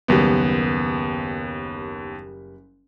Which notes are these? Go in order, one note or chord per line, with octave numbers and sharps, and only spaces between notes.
F#1 D#2 G3 B3